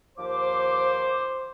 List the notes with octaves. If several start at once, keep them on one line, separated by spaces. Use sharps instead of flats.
D#2 F3 C5 D6